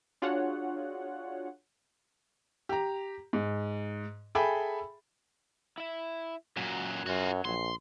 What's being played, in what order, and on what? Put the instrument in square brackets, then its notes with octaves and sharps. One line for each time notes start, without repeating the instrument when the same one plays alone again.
[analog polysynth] D4 F4 F#4 G#4 C#5 F#5
[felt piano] G4 A#5
G#2
G#4 A4 E5 G5 G#5 B5
[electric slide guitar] E4 E5
[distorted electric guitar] F#2 A#2 [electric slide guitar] F#3
[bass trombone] F#2 [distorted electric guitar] F4 F#4
[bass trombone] A#1 [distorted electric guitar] C6